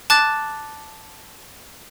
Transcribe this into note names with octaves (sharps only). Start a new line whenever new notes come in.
A5 D6 F#6 A6